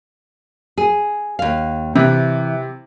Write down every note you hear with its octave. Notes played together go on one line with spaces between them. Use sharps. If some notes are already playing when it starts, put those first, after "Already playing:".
G#4
D#2 F5
C3 E3